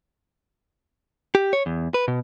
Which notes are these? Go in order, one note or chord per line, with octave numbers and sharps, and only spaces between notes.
G4
C#5
E2
B4
B2